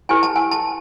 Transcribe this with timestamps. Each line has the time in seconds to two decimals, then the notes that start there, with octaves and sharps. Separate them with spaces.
0.09 E4 G4 B4 G#5
0.23 A5
0.36 G#5
0.51 A5